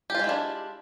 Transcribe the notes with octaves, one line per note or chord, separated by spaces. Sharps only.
G#3 D4 E4 F4 G4